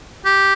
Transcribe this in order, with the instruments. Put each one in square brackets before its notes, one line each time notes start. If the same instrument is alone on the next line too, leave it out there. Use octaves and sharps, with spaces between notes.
[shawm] G4